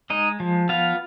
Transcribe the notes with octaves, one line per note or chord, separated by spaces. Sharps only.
G#3 D#4 D#5
F3
B3 F4 F5